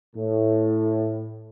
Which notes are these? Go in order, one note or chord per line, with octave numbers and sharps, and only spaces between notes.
A2